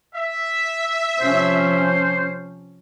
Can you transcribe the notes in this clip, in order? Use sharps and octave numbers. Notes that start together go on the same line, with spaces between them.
E5
C3 F3 C#4 C5